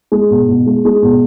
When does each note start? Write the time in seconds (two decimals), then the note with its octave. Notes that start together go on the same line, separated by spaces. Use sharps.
0.12 G#3
0.30 B2
0.48 B2
0.66 G#3
0.85 G#3
1.02 B2